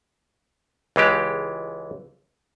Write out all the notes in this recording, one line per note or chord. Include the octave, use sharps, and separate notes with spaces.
C#2 E3 G#3 G4